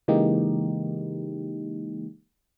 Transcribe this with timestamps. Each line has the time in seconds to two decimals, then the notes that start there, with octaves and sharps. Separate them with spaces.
0.08 C#3 E3 G#3 A#3 D#4 G4